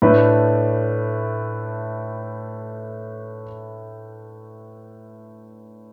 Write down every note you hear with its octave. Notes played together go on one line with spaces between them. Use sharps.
A2 A3 D4 B4